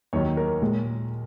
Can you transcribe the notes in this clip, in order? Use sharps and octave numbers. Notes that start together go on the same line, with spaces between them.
D#2 D#3 F#3 C#5
A#4
A#2 G#3